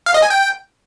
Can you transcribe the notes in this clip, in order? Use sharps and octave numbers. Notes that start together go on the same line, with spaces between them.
F5
D#5
G#5
G5